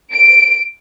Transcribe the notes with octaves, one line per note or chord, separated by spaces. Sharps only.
D7